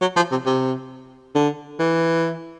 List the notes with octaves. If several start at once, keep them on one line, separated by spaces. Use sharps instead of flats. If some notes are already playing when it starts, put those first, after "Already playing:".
F#3
F3
C3
C3
D3
E3